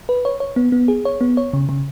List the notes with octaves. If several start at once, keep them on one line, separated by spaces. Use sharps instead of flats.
B4
C#5
C#5
B3
B3
G#4
C#5
B3
C#5
C#3
C#3